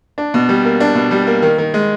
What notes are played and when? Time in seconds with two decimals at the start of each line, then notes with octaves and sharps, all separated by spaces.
0.18 D4
0.34 B2
0.49 G3
0.64 A#3
0.80 D4
0.95 B2
1.11 G3
1.27 A#3
1.42 D#3
1.58 D#3
1.74 G#3